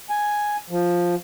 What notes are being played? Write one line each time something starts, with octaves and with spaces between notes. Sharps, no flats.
G#5
F3